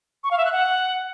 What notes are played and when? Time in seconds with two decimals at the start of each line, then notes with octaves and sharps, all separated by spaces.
0.24 C#6
0.31 F5
0.38 E5
0.45 F#6
0.52 F#5